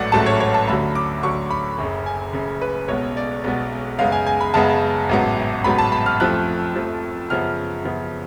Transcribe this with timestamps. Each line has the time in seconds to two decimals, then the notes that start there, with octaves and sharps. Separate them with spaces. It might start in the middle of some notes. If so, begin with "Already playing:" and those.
Already playing: A1 G#2 F#3 A3 D5 F#5
0.12 A1 G#2 F#3 A3 A5
0.26 C#5
0.40 C#5
0.54 A5
0.67 D2 D3 F#3 B5
0.95 D6
1.23 D2 D3 F#3 C#6
1.51 B5
1.78 F#1 F#2 C#3
2.06 G#5
2.33 F#1 F#2 C#3
2.61 B4
2.88 B1 B2 G#3 B3 C#5
3.17 D5
3.44 B1 B2 G#3 B3
3.99 F#2 C#3 G#3 B3 F5
4.12 G#5
4.27 G#5
4.41 B5
4.54 F#2 C#3 G#3 B3 A5
5.09 A1 G#2 F#3 B3
5.64 A1 G#2 F#3 B3 B5
5.79 A5
5.92 B5
6.06 F6
6.20 F2 F3 A3 F#6
6.75 F2 F3 A3
7.30 F#2 C#3 F3 B3 F6
7.85 F#2 C#3 F3 B3